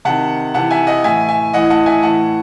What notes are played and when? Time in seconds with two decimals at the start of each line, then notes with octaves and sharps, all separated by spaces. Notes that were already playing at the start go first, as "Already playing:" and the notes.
0.05 C3 D#3 F#5 A5
0.54 C3 E3 F#5 A5
0.71 E5 G#5
0.87 D#5 F#5
1.04 A2 E3 E5 G#5
1.29 E5 G#5
1.53 A2 E3 D#5 F#5
1.70 F#5 A5
1.86 E5 G#5
2.03 A2 E3 F#5 A5